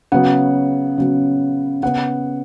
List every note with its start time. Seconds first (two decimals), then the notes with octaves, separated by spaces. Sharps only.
0.12 C#3 F#3 B3 F#5
0.98 C#3 F#3 B3
1.83 C#3 B3 F#5